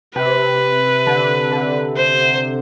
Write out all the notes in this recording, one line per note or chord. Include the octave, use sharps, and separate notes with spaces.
C3 B4
D3
D3
C5